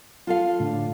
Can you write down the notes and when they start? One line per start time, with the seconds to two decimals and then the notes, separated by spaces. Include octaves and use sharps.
0.27 F4 A4 F5
0.60 A2 D3